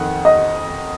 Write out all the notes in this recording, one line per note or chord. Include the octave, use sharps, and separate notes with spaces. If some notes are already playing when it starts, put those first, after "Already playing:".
Already playing: F2 D#3 F#5
D#5